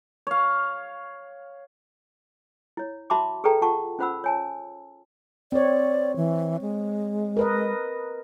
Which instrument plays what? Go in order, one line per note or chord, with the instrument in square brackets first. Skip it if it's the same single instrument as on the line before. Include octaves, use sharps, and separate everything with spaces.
[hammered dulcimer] C#5 F5
[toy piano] E4 C#5
F#4 E5 A5 B5 C6 D6
G#4 A4 B4 D5 G5 A#5
F4 F#5 A5 C#6
C#4 F4 C5 F#5 B5 E6
C#5 G#5 A5
[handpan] C4 C#5 [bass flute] D5
[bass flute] E3
G#3
[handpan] A#4 B4 D#5